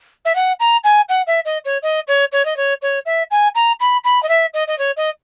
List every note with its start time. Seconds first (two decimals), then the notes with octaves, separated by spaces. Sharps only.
0.25 E5
0.35 F#5
0.59 A#5
0.84 G#5
1.09 F#5
1.27 E5
1.45 D#5
1.64 C#5
1.82 D#5
2.07 C#5
2.32 C#5
2.45 D#5
2.56 C#5
2.81 C#5
3.05 E5
3.31 G#5
3.55 A#5
3.80 B5
4.04 B5
4.22 D#5
4.28 E5
4.53 D#5
4.67 D#5
4.78 C#5
4.96 D#5